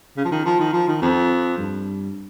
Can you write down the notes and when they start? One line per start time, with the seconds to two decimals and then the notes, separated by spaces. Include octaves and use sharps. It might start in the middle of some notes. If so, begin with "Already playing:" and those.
0.17 C#3
0.25 F3
0.32 D#3
0.45 F3
0.59 D#3
0.73 F3
0.88 D#3
1.02 F2
1.58 G2